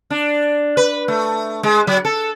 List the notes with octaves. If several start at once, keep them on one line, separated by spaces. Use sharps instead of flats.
D4
B4
A3
G#3
F#3
A4